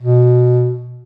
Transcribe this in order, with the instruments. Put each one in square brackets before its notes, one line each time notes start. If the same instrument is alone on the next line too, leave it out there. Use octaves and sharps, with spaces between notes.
[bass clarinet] B2